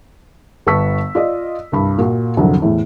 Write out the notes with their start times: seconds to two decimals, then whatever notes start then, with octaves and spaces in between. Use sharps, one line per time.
0.67 G1 B4 A5 C#6 E6 B6
1.15 F4 D5 D#5
1.72 C2 G2 B5
1.98 A#2 F#4
2.37 C2 F2 D3 F#3
2.62 E2 A2